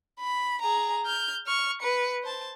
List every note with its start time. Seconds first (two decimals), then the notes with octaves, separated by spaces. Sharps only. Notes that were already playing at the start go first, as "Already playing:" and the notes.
0.20 B5
0.61 G#4 A#5
1.05 F6 G6
1.47 C#6 F6
1.81 B4 C#7
2.23 C5 A5